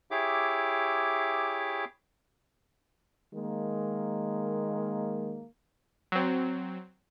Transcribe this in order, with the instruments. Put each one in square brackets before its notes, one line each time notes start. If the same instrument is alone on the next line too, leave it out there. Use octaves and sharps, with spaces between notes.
[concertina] E4 G4 G#4 C#5 E5 D6
[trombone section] D#3 G#3 A#3
[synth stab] F#3 C4